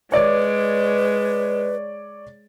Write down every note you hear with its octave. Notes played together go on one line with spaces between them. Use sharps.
G#3 B4 C#5 D5 D6